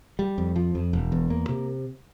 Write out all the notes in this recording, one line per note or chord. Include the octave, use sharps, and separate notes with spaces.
G3
F2
F3
F2
E1
E2
A#3
C3